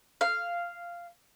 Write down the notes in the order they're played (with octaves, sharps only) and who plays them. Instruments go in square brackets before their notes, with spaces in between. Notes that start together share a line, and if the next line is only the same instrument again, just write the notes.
[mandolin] F5